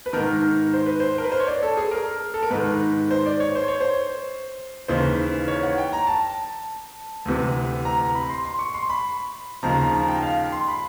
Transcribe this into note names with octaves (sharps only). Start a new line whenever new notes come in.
B4
G#2 D#3 A#4
C5
B4
C5
A#4
B4
C5
C#5
D5
A4
G#4
A#4
A4
A#4
G#2 D#3 B4
C5
D5
C#5
C5
C#5
C5
D#2 C#3 E3 C5
C#5
F#5
G5
A#5
A5
D2 C3 E3
A#5
A#5
B5
C6
C6
C#6
C6
B5
D#2 C#3 F3 A#5
A#5
A#5
G5
F5
C6
B5